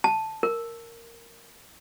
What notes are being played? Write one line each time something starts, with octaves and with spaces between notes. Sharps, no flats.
A5
A#4